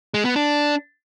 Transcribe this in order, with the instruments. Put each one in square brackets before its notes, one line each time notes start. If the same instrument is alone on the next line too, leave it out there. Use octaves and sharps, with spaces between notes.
[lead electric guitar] G#3
B3
D4